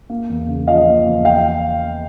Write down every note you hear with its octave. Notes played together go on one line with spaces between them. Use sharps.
A#3
E2
C#3
F3 D#5 F5
A#3
E2
F5 G5